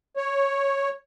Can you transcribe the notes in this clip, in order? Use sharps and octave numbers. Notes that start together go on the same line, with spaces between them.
C#5